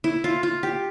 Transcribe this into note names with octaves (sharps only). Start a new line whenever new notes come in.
E4
F4
F4
G4